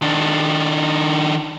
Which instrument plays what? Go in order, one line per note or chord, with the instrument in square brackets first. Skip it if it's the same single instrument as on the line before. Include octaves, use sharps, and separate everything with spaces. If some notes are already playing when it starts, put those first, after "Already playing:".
[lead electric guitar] D#3 D4